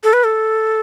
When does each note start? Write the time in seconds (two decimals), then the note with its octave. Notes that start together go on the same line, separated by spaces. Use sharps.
0.04 A4
0.13 B4
0.24 A4